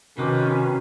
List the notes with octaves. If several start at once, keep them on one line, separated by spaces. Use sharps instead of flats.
C3 D#3 C#4 F#4 B4 D6